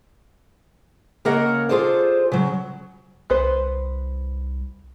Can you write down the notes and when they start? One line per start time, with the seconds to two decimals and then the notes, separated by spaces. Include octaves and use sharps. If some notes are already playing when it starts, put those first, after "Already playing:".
1.25 C#3 A#3 A#4 C#5 D#5 F#5
1.69 F4 G#4 A4 C5 D5
2.32 C#3 F#3
3.30 C2 B3 B4 C5